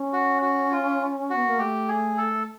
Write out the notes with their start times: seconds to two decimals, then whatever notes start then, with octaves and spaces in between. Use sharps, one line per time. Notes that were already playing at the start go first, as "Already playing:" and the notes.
Already playing: C#4
0.13 F#4
0.42 F#4
0.72 F4
1.30 F#4
1.35 B3
1.47 A#3
1.59 A3 G4
1.88 G#4
2.18 A4